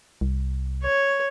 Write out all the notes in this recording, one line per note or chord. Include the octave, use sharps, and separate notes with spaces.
C2
C#5